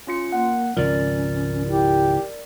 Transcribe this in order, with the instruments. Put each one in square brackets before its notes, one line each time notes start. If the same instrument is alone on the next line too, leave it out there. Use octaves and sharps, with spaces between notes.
[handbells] C#4 F4 C#7
[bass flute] A#3 [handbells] F#5
[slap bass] G#1 C#2 F3 [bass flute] C#4 [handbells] A#4 D5
[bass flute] E4 [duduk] G4